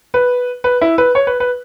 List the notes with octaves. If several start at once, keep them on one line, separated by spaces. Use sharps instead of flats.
B4
B4
E4
B4
C#5
B4
B4